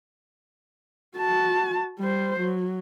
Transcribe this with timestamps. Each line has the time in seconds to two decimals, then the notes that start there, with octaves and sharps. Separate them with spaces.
1.16 F#4 A5
2.00 G3 C5
2.40 F#3